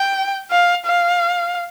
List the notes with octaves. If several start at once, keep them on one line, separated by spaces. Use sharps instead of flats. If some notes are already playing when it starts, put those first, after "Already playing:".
Already playing: G5
F5
F5